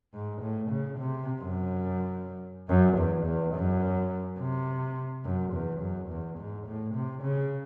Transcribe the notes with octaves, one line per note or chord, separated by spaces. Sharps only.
G#2
A2
C#3
C3
F#2
F#2
E2
E2
F#2
C3
F#2
E2
F#2
E2
G#2
A2
C3
C#3